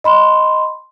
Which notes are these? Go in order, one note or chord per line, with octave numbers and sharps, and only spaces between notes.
D#5 B5 C6